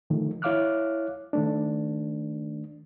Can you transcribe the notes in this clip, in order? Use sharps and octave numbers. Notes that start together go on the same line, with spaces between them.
D3 D#3 F3 A3
E4 C#5 F5 D6 F6 F#6
D#3 A3 D4